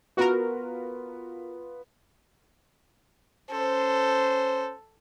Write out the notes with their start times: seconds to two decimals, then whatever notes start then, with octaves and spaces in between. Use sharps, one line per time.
0.17 B3 F4 F#4 A#4 B4
3.51 C#4 A4 C5